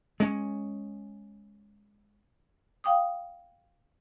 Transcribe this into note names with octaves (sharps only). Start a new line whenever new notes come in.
G#3 C#4
F5 G5 D6 D#6